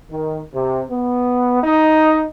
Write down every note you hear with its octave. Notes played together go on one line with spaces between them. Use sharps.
D#3
C3
B3
D#4